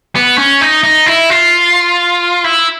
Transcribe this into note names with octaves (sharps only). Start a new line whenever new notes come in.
B3
C#4
D#4
D#4
E4
F4
E4